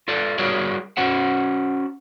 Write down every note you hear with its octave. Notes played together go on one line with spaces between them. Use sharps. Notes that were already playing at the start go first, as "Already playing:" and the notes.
F4 A4 D5
G3 F#4 G#4 A#4 C#5 D5
C#4 F#4 C5 F#5